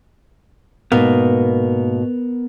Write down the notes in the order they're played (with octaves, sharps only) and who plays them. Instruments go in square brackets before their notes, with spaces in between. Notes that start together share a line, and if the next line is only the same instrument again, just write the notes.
[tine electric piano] G#2 A#3 [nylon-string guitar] B2 [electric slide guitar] B3 A#4